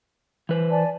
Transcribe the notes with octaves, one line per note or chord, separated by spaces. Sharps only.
E3 B4 C5
D5 G#5 A5